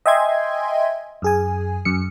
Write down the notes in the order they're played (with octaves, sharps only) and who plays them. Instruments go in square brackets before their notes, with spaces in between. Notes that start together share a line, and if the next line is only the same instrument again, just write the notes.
[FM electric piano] D#5 E5 G5 G#5 C6 G#6
F#2 G#4 G#5
F#2 C#7